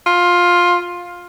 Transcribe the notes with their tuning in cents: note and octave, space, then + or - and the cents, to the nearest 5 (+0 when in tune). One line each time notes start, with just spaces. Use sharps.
F4 +10